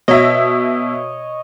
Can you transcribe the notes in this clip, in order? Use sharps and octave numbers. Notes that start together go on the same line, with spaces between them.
B2 C#5 D#5 E5